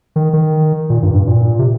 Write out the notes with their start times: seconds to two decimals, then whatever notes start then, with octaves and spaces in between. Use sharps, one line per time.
0.16 D#3
0.33 D#3
0.90 A#2
1.03 G2
1.14 G2
1.27 A#2
1.59 C3